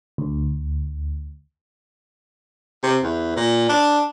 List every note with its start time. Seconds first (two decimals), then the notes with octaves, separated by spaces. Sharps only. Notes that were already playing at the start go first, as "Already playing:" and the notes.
0.18 D2
2.83 C3
3.03 E2
3.36 A#2
3.69 D4